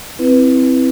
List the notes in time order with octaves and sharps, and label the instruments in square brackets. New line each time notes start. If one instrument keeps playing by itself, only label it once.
[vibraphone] C4 E4 B4